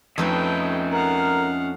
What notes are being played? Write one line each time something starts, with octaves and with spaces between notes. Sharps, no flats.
F2 A3 C#4 D#4 B4 D#5 E5 G5
A#4 F5 F#5